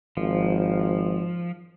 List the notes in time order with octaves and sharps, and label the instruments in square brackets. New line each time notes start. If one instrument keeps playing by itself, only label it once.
[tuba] G#1 [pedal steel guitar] F3